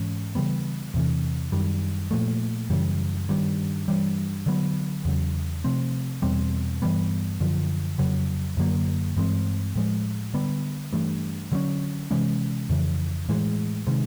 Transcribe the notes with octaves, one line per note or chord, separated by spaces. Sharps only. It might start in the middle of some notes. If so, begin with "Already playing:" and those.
Already playing: G#2 E3 G#3 C#4
C#3 E3 G3 B3
E2 C3 E3
F#2 D#3 G3
A#2 F3 A3
F#2 C#3 E3 G3
G2 D#3 G3
G2 E3 G3
D3 F#3 B3
E2 C#3 F#3
C3 F3 A3 C4
E2 B2 G3 C4
G2 E3 G3 B3
F#2 D3 F3
F2 C#3 F#3
F#2 D3 F#3 A#3
G2 E3 G#3 C4
A2 F3 G#3
D3 G3 B3
G2 E3 A3
D3 F#3 A#3 C#4
C3 E3 G#3 C#4
F2 C#3 E3
A2 E3 G#3
C3 D#3 G#3